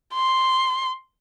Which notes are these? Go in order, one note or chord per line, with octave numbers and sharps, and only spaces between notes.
C6